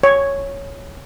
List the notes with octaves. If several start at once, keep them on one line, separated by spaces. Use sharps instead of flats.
C#5